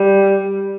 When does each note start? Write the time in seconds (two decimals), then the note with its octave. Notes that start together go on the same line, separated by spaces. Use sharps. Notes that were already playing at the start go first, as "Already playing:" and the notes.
Already playing: G3